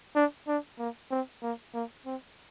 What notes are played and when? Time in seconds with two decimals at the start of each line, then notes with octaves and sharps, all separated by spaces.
0.16 D4
0.48 D4
0.79 A#3
1.11 C4
1.43 A#3
1.74 A#3
2.06 C4